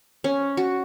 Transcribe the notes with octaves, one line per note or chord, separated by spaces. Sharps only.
C#4
F#4